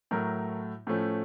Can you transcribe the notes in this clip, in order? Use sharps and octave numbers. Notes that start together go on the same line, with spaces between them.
A2 F#3 A3 A#4
A2 F3 A3 C#4